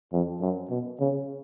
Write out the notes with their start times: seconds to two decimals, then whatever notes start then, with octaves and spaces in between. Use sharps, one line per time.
0.13 F2
0.41 F#2
0.70 B2
1.00 C#3